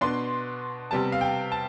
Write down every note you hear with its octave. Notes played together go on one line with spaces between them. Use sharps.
B2 B3 D4 C6
C3 G3 B3 A5
F5
G5
A5